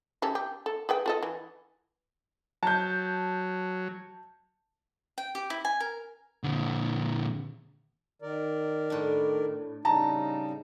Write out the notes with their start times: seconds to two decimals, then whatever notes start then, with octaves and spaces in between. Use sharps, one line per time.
0.22 C#3 G4 A4
0.35 G4
0.66 A4
0.89 G#4 B4 G5
1.06 F4 A4 D#5
1.23 E3
2.63 F#3 A5 G6
5.18 G5
5.35 G4
5.50 E4
5.65 G#5
5.80 A#4
6.44 A#2 D3
8.22 D#3 A#4 D5
8.90 A2 D4
9.85 C#3 G3 D#4 A5 A#5